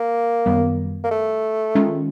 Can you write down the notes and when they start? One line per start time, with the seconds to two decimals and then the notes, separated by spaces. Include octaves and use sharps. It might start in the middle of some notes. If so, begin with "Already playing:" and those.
Already playing: A#3
0.46 F#2 D#3 G3 B3
1.04 A#3
1.11 A3
1.75 D#3 G#3 C#4 F4